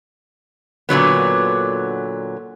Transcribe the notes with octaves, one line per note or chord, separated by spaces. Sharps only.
A#2 D3 F#3 B3